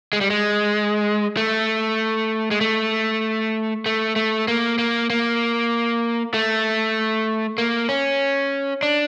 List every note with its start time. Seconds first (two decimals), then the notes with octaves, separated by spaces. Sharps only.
0.13 G#3
0.21 G3
0.30 G#3
1.37 A3
2.51 G#3
2.61 A3
3.86 A3
4.16 A3
4.48 A#3
4.78 A#3
5.10 A#3
6.34 A3
7.58 A#3
7.89 C#4
8.83 D4